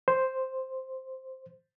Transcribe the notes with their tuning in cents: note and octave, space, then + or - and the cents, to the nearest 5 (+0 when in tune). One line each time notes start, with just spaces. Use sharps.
C5 +0